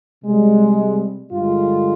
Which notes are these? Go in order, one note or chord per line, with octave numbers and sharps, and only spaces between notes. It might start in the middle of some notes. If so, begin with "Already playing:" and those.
C3 G3 G#3
G2 D3 G#3 F4